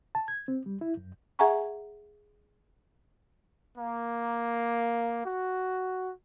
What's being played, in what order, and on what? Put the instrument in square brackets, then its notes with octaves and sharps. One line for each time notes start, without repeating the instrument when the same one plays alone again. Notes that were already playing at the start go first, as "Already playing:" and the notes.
[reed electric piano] A5
G#6
C4
G3
E4
F#2
[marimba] G#4 E5 F#5 G#5 A#5 C#6
[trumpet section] A#3
F#4